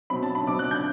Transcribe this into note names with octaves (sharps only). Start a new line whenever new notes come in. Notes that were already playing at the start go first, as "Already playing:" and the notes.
B2 F#3 C4 B5
A5
B5
B2 F#3 C4 D6
F#6
G6